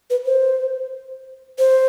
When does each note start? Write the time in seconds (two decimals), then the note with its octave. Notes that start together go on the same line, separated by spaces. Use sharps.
0.10 B4
0.26 C5
1.59 C5